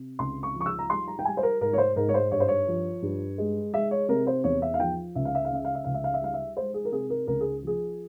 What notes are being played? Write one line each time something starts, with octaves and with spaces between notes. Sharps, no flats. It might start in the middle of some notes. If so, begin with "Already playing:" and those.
Already playing: C3
C#2 C6
C#6
F3
C#6
E6
A#5
G3 C6
A#5
G5
G3 G#5
C5
A#4
G#2 A#4
C#5
C5
G#2 A#4
C#5
C5
G2 C#5
C5
C#5
F3
G2
G#3
G#3 E5
C#5
C3 A#4
C5
E2 C#5
E5
F5
F3 G5
C#2 E5
F5
E5
F5
C#3 E5
F5
E5
C#2 F5
E5
F5
E5
G3 F5
E5
G#3 C5
G#4
A#4
C3 G#4
A#4
C#2 A#4
G#4
F3 G#4